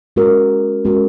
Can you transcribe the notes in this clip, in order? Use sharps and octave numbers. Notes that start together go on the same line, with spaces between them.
G#3 C#4 F#4 A#4
G#3 C#4 F#4 A#4